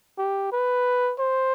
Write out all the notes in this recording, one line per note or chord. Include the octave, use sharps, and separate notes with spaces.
G4
B4
C5